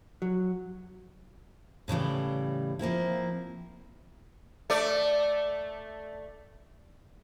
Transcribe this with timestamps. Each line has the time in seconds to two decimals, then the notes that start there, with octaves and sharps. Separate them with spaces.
0.22 F#3
1.88 A2 C#3 E3 G3
2.79 F3 A#3 C4 E4
4.70 A3 D5